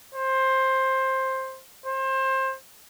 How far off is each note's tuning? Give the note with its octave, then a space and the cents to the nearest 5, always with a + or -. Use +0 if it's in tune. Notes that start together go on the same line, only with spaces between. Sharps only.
C5 +15
C5 +25